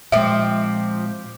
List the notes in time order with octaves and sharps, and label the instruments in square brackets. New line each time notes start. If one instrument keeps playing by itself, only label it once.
[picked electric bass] A#2 G#3 [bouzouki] F3 C4 [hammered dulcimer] G4 [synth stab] E5